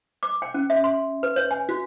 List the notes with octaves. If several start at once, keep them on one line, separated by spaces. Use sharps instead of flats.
D6
G5
C#4
E5
C6
B4
C#5
G#5
F#4